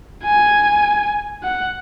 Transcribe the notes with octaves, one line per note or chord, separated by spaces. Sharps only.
G#5
F#5